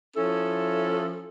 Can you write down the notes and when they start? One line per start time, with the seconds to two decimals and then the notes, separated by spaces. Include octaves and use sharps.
0.17 F3 C#4 E4 A4